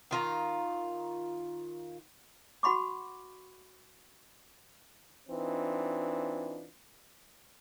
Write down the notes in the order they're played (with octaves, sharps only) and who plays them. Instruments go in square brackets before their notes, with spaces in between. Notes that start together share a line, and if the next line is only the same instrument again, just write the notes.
[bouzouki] D#3 F4 A#5
[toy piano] F#4 F#5 B5 C#6 D6
[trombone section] E3 C4 D4 D#4 F4